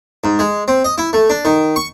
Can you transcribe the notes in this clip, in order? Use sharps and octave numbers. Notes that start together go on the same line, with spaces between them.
G#2
G#3
C4
D#5
E4
A3
D4
D#3
C#6